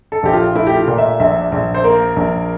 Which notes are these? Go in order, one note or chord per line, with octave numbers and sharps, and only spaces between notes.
A4
A#1 G4
F4
A3 E4
G4
F4
A#2
E5
A#1 E5
A#1
C5
A#3 A#4
A#1